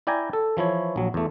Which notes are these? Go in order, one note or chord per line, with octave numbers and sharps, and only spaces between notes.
E4 D5 G5 G#5 A#5
A4
E3 F3 E4 C#5
A#1 F#3
E2 A3